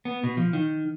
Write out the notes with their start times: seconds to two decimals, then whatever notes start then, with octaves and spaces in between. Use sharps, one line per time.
0.05 B3
0.24 B2
0.37 F3
0.53 D#3